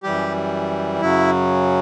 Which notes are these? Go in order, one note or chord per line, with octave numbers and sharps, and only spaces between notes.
F#2 E3 G3 G4
F#2 C#3 F#3 E4